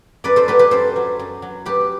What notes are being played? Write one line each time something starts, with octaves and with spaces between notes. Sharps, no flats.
F#2 B4 D5
A4 C5
F#3 G4 B4
G4 B4
F#2 A4 C5
F#3
F#2
F#3
F#2 G4 B4